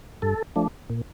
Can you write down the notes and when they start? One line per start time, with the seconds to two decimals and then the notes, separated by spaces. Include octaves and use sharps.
0.22 G2 A4
0.56 F3 A3 D4
0.90 A#2